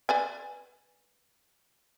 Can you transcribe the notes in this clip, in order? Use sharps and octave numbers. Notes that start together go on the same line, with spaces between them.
B4 D5 G#5